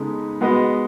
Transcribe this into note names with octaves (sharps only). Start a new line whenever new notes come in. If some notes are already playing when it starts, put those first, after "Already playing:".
Already playing: C#3 G#3 B3 D#4 A4
G#3 B3 F#4 B4 D#5